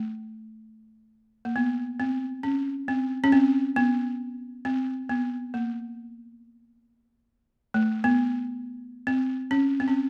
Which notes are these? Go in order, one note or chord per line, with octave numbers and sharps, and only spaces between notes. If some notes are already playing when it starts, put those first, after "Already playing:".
Already playing: A3
A#3
B3
C4
C#4
C4
C#4
C4
B3
C4
B3
A#3
A3
B3
C4
C#4
C4
C#4